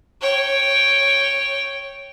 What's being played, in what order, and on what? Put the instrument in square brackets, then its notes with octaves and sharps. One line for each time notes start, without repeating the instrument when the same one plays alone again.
[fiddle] C#5 G5